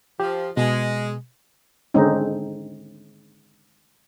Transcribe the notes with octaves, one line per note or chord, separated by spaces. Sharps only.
F3 G4
B2 G#3
D3 D#3 G#3 C4 C#4 D#4